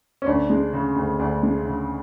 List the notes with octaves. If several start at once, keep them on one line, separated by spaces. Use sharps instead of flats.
C#4
D2 D4
G#3
C#3
D2
D2 D4
G#3
C#3